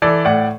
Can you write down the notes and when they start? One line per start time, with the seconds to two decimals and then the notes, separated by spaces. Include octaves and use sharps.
0.02 E3 A4 D5
0.25 A2 D5 F#5